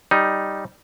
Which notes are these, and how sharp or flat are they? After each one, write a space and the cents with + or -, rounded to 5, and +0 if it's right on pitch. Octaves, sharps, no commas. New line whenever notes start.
G3 +0 D#4 +0